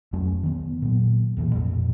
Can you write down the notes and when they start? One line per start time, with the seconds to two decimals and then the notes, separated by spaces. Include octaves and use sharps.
0.13 F2 F#3 A3 C#4
0.43 D#3 B3
0.82 A#2 F#3
1.37 E1 A#2 E3 A#3
1.55 A#1 F2 A2